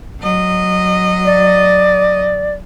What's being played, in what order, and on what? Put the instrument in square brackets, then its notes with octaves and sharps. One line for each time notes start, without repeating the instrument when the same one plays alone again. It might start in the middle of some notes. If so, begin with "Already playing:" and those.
[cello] F#3 D#5
[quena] D5